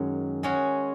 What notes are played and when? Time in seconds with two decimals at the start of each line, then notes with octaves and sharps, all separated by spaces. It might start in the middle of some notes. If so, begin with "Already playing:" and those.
Already playing: F#2 D#3 G#3 C#4
0.43 G#3 C#4 F#4